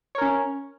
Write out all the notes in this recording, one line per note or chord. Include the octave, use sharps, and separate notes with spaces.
C#4 A#4 C#5